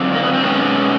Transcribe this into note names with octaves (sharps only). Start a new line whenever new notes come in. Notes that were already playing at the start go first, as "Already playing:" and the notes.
Already playing: F2 D3 F#3 C4 D4
A#3
B3
C4
B2 G#3 B3 C#4